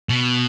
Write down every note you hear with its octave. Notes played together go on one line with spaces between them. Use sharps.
B2